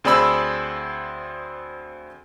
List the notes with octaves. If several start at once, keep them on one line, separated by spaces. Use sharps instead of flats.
D2 C4 G#4 D5 B5 E6